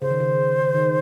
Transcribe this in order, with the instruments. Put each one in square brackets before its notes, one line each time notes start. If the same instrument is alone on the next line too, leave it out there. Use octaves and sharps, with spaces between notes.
[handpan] C#3 [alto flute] C5
[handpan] D#3
C#3
D#3